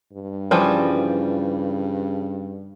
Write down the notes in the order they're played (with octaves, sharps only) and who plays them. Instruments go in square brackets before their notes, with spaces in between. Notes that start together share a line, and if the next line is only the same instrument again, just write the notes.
[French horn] G2
[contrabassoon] C#3 [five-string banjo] E3 F3 G3